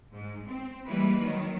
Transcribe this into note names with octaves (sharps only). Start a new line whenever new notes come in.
G#2
C4
E3 G3 G#3 A#3 B4
D#3 F#3